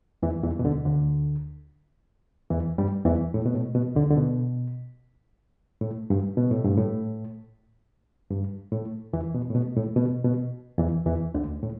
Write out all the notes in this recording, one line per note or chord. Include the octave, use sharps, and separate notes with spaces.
E2 E3
E2 E3
B2
D2 D3
D2 D3
E2 E3
G2 G3
E2 E3
A2
B2
A2
B2
D2 D3
D3
B2
A2
G2
B2
A2
G2
A2
G2
A2
E2 E3
B2
A2
B2
A2
B2
B2
E2 E3
E2 E3
D2 D3
A2